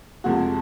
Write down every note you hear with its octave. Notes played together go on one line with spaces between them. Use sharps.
F2 C3 F3 G#3 F#4